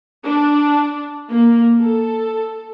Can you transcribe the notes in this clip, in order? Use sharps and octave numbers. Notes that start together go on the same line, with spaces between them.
D4
A#3
A4